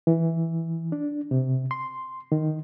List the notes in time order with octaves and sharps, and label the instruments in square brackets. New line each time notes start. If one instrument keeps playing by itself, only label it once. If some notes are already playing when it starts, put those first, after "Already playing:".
[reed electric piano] E3
D4
C3
C6
D#3